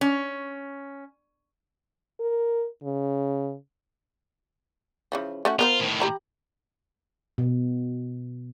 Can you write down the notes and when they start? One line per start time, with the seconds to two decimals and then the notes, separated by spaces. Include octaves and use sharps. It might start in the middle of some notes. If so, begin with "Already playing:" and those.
0.01 C#4
2.20 A#4
2.83 C#3
5.12 C#3 E3 F3
5.45 A3 C#4 F#4
5.59 B3 F4 A#4 C5
5.80 A2 D#3
6.00 G4 A#5 B5
7.38 B2